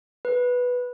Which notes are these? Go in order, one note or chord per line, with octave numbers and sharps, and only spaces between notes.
B4